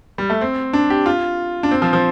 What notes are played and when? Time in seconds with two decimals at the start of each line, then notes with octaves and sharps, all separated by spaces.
0.18 G3
0.30 A3
0.41 C4
0.73 D4
0.90 G4
1.06 F4
1.63 D4
1.71 C4
1.82 F3
1.93 F3